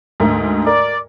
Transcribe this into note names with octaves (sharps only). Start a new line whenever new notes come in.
D2 G#2 A#4
A#4 D5